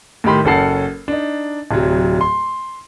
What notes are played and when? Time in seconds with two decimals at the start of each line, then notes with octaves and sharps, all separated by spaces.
0.24 A2 D#3 G4 B5 C6
0.45 F#1 C#4 A4 F#5 A5 C7
1.08 D4 D#4
1.71 D1 C3 F#3
2.21 C6